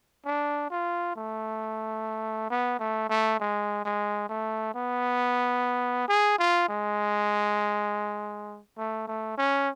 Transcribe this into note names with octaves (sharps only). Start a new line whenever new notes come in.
D4
F4
A3
B3
A3
A3
G#3
G#3
A3
B3
G#4
F4
G#3
A3
A3
C#4